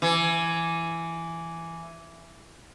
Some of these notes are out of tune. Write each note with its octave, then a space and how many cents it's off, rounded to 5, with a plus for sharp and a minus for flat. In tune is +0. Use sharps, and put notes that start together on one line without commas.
E3 +15